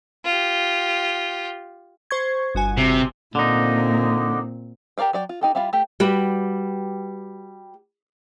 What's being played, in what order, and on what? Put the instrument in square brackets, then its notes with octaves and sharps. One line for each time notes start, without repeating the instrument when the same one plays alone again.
[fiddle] F4 G4
[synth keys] C5 C#6 G#6
G1 F#4 G#5
[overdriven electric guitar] C3
[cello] A#2 C4 [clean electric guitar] D3 D#4
[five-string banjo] G4 A#4 D5 F5 G5
F#3 D5 G5
F4
D#4 G4 A4
G3 E4 F4 F5
A3 G4
[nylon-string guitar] G3 F#4 G4 B4